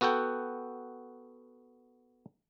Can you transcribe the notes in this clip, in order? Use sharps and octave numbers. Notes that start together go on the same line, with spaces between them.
B3 F#4 A4 F#5 G5